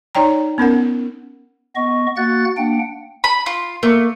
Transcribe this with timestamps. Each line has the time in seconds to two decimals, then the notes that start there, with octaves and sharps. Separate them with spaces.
0.15 D#4 C#5 D5 G5 A#5
0.58 B3 C#4 A#4 F#5
1.76 B3 D#5 C#6
2.16 A#3 F#4 F#5 F#6 A6
2.57 A#3 D4 F#5 G5
3.24 B5
3.46 F4
3.83 A3 A#3